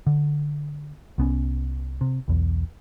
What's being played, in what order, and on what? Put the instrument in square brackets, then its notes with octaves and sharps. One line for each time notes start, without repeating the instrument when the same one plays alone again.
[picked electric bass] D3
C2 B3 C#4
C3
B1 E2